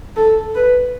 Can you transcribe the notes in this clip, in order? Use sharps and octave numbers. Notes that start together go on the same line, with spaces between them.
A4
B4